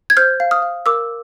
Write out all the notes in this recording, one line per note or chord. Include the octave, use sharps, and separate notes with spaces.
G#6
C5 F6 G6
F5
D#6 F6
F5
A#4 D6 E6